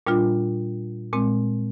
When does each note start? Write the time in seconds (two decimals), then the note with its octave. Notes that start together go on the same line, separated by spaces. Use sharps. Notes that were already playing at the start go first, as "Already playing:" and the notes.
0.07 A#2 G3 D4 F4
1.13 A#2 G#3 C4